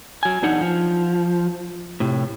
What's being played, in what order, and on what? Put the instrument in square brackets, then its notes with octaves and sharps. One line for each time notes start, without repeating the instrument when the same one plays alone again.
[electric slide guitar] F#3 G#5
E2 D4 D#4 F#5
F3
A2 C3